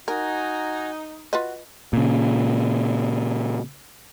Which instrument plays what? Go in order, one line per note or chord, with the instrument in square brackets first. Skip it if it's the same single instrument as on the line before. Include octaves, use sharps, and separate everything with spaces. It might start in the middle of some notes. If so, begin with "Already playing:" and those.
[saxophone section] D#4 [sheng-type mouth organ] F#4 G#5 A#5 [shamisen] A#4
[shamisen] F4 B4 D#5 [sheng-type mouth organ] F#4
[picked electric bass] A#2 C#3